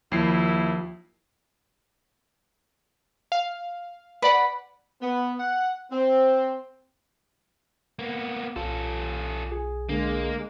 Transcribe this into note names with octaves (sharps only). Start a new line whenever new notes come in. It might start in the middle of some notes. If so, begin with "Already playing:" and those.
D#2 F3 E4 C7
F5
B4 D5 F#5 B5
B3
F#5
C4
A#3 B3
B1 C#4 F4 A4
G#4
D3 G#3 A#3